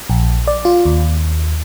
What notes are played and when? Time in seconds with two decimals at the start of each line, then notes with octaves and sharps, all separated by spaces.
0.10 A#1
0.47 D5
0.65 F4
0.85 D#2